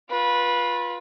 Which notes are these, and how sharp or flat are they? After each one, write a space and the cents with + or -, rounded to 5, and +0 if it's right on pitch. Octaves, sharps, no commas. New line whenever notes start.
F4 +15 B4 -15